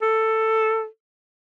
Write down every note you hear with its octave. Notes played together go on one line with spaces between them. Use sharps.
A4